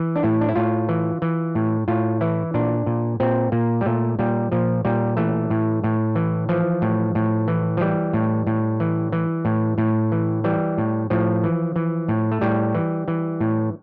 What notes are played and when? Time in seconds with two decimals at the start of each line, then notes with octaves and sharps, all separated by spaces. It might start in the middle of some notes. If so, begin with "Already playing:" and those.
Already playing: E3
0.16 D4
0.23 A2 E4
0.41 D4
0.49 E4
0.56 A2 F4
0.89 E3
1.22 E3
1.55 A2
1.88 A2 F4
2.21 E3 E4
2.54 A#2 D4
2.86 A#2
3.20 A#2 C4
3.52 A#2 A#3
3.81 G3
3.86 A#2 A3
4.19 A#2 G3
4.52 A#2 F3
4.85 A#2 G3
5.17 E3 A3
5.50 A2
5.84 A2
6.15 E3
6.49 E3 F3
6.82 A2
7.15 A2
7.48 E3
7.77 F3
7.81 E3 G3
8.13 A2
8.47 A2
8.80 E3
9.13 E3
9.45 A2
9.78 A2
10.12 E3
10.44 E3 G3
10.78 A2
11.10 A2 F3
11.44 E3
11.76 E3
12.09 A2
12.32 A3
12.41 A2 G3
12.75 E3
13.08 E3
13.40 A2